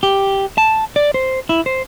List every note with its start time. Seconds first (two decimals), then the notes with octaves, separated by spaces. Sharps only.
0.03 G4
0.58 A5
0.96 D5
1.14 C5
1.49 E4
1.66 C5